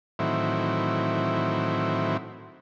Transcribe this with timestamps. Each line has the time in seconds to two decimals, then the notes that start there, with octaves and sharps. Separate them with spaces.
0.19 A2 D#3 E3 F#3 C4 E4